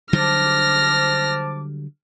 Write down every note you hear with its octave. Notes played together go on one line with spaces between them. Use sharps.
D3 F#3 G3 C5 A5 D6 F6 A#6